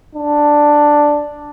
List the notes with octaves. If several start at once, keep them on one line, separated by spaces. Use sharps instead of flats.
D4